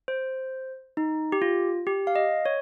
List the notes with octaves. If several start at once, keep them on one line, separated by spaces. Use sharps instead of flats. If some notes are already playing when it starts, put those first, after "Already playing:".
C5
D#4
G4
F4
G4
F5
D#5
C#5